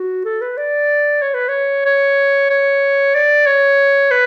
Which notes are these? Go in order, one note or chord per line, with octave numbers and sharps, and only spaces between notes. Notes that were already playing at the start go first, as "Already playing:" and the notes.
Already playing: F#4
A4
B4
D5
C#5
B4
C#5
C#5
C#5
D5
C#5
B4